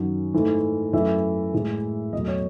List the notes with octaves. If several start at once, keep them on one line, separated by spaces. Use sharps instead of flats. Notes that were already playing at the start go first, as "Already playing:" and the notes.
Already playing: F#2 D#3 F#3
G#2 E3 A3
F#2 E3 A3 E5
A2 E3 G#3
E2 B2 F#3 A3 D#5
C#5